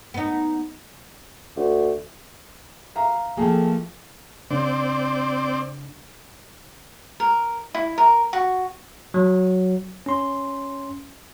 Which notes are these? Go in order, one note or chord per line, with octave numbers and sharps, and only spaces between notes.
B3 D#4
D2
E5 F5 A#5
F3 A3 A#3 G#4 A4 G5
C#3 C4 D4 D5
A#4
E4
A#4
F#4
F#3
C#4 C6